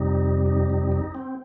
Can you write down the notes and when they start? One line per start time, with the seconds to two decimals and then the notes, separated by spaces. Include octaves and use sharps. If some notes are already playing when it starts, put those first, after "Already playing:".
Already playing: F2 C3 G3 D#4
0.46 D#4
0.70 D#4
0.92 D#4
1.15 C4